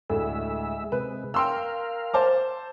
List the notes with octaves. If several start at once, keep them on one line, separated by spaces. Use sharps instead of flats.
D2 A2 G#3 E5
C3 G#3 B4
A#4 F5 G5 C6 E6
C5 A5 D6